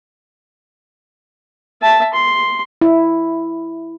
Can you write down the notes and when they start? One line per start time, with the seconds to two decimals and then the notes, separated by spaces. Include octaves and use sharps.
1.82 E5 A5
2.14 C6
2.81 E4